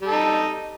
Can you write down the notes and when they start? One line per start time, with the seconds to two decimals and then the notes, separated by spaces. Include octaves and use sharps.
0.02 G3
0.07 A4
0.11 D#4